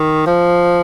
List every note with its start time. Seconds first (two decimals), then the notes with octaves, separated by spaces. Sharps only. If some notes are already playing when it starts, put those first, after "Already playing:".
Already playing: D#3
0.26 F3